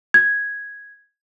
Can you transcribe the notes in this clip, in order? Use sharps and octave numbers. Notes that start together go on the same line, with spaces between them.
G#6